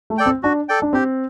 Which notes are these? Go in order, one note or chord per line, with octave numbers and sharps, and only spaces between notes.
A3
A4 D5 G5
C4
D4 F#4
A4 D5 G5
D4
C4 G4